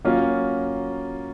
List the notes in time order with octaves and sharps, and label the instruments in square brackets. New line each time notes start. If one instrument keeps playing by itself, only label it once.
[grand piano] F#3 A#3 C#4 F4 A#4